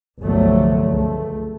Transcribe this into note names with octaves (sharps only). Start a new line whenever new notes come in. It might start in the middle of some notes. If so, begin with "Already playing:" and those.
G1 C2 D3 F3 F#3 A3
C#2 A3